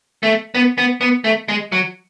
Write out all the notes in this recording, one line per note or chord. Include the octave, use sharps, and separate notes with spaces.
A3
B3
B3
B3
A3
G#3
F#3